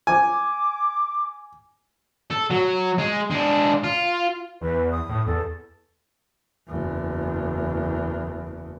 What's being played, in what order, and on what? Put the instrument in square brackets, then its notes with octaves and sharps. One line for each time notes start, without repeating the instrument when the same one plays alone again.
[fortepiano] G#5 [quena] D6
[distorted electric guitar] A4
F#3
G#3
G#3 D4
F4
[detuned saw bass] E2 [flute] B4
[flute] D#6
[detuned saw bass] A2
[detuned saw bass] E2 [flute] A4
[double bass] F#1 E2